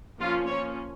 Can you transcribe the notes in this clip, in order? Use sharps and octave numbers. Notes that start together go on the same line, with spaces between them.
F3 A#3 C#4 F4
F3 A#3 C#4 C#5